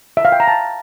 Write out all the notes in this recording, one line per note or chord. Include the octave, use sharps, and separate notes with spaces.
E5
F5
G5
A#5
A5